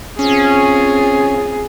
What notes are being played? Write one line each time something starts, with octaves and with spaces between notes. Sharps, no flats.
C4 C#4 F4 G#4